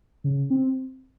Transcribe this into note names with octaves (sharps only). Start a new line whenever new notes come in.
C#3
C4